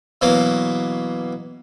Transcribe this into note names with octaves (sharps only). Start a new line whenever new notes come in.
B2 E3 F#3 A#3